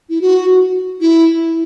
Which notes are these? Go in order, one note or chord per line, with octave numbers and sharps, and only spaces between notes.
E4
F#4
E4